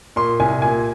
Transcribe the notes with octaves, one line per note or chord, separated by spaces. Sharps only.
A#2 C6
C2 G#5
A#2 G#5